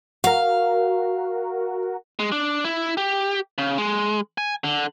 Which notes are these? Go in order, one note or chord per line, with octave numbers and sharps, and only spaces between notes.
F#4 A#4 F5
G#3
D4
E4
G4
C#3
G#3
G#5
D3